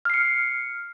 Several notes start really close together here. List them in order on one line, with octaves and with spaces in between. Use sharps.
F6 C7 C#7